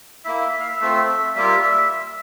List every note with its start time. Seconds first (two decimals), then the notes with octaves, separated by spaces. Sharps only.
0.25 A#3 E4 E5
0.53 E5
0.60 F5
0.68 E5
0.81 A3 C4 F4
1.36 G3 A#3 F4 E5
1.63 E5